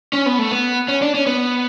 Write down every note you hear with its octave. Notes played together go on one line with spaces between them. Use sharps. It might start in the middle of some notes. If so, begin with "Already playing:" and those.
C#4
B3
A3
B3
C#4
D4
C#4
B3